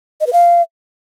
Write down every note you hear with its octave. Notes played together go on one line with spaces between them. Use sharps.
D#5
B4
F5